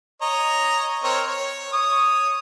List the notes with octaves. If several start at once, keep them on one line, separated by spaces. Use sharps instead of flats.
C#5 D#5 A#5
C4 A#4 C#5
C#5
C#5 D#6